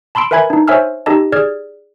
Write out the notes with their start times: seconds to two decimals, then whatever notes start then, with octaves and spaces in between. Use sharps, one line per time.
0.15 A5 B5 C6 E6 D7
0.31 A#4 B4 E5 G#5 B5 G#6
0.50 D4 D#4
0.68 C5 C#5 E5 G#5 E6 F6
1.06 D#4 G4 A4 D#5 A5
1.32 G#4 D5 F6 G#6